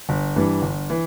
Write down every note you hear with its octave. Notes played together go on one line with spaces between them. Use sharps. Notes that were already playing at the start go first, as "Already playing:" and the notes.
G1
G2 E3 G3
G1
E3